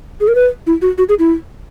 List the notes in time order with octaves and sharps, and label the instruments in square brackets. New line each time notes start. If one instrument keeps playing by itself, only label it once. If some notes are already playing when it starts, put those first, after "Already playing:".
[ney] G#4
A#4
B4
E4
F#4
F#4
G#4
E4